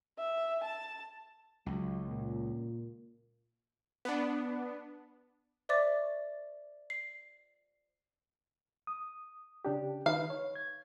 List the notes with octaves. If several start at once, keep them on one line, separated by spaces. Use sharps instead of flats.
E5
A5
C#2 F#3
A#2
B3 D4
C5 D5 E5 C#6 D6 A6
C7
D#6
C#3 D4 G4
D#3 D#4 B4 F5
C#5
G#6